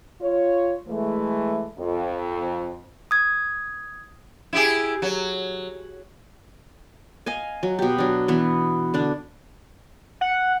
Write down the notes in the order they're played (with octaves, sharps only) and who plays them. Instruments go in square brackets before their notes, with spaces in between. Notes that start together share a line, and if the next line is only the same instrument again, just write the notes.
[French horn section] F4 C#5
E3 G#3 A3
F2
[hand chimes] D#6 G#6
[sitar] E4 G4 G#4
F#3
[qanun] D#5 F5 G#5
F#3
B2 G4
F#3 D4
E3 B3
D3 D4
[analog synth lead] F#5